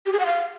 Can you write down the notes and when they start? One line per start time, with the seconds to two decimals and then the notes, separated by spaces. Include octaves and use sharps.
0.06 G4
0.13 G#4
0.19 F#5
0.26 F5